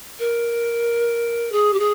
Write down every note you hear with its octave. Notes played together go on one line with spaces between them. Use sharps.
A#4
G#4
G4
G#4